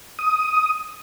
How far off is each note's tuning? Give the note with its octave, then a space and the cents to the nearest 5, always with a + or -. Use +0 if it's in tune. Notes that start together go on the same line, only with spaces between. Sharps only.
D#6 +10